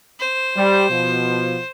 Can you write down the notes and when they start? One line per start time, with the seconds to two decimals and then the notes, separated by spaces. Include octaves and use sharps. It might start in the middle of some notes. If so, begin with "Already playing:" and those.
0.20 C5
0.57 G3
0.90 B2 F3